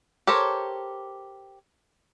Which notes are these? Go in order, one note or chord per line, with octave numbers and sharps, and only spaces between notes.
G4 A4 A#4 C5 C#5